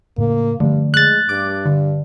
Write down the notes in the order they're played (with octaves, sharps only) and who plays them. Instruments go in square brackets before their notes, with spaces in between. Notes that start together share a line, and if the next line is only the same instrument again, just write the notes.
[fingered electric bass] A2 C#3 [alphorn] A#3
[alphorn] G2 [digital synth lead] D3 [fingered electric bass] F3 A3
[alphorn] G#3 [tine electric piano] F#6 A6
[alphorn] G2 [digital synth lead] D6
[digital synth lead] D3